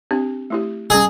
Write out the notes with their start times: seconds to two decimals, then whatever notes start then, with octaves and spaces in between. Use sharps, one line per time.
0.11 C4 D4 G4
0.50 A3 E4 G4
0.90 G3 C#4 G#4